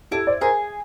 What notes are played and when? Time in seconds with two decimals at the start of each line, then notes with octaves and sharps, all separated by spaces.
0.11 E4 G4 A4
0.27 C5 D5
0.41 G#4 A#4 C5